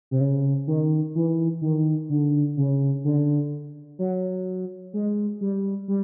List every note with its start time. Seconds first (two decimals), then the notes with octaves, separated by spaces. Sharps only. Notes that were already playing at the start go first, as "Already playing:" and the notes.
0.11 C3
0.21 C#3
0.67 D#3
1.15 E3
1.61 D#3
2.09 D3
2.57 C#3
3.04 D3
3.99 F#3
4.94 G#3
5.41 G3
5.88 G3